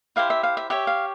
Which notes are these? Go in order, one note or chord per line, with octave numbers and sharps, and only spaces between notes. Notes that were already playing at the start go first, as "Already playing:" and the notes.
E4 G4 C5 F5
E5
F5
E5
G4 C#5 E5
F5